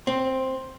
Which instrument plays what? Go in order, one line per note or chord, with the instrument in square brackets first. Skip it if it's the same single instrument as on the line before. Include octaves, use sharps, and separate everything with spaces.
[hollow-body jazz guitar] C4